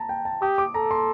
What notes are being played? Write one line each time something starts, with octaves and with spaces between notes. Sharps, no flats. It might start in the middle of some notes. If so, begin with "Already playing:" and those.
Already playing: A5 A#5
G5
A5
G4 D#6
D6
A4 A#5
C6